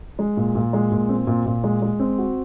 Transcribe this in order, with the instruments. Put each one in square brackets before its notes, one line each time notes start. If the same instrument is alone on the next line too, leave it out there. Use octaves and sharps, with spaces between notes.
[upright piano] G#3
A#2
A#2
G#3
A#2
C4
A#2
A#2
G#3
G#3
C4
F#4